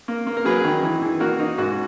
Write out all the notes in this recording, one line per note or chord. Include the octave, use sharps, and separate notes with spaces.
A#3
A#3
A#4
F#3 G#4 B4
D#3
E3
E3
A#3 F#4 A#4
D#4
G#2 F#4